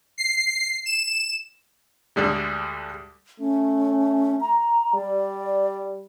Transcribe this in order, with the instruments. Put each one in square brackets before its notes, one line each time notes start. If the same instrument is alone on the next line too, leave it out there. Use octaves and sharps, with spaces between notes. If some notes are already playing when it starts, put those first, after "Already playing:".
[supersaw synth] C7
E7
[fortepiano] D2 D3 G3 G#3
[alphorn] A3 [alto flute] C#4
[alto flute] A#5
[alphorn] G3 [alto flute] D5